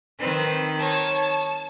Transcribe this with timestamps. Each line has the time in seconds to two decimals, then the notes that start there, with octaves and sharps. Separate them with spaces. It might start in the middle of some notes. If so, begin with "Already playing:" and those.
0.20 D#3 C4 B4
0.79 C#5 A5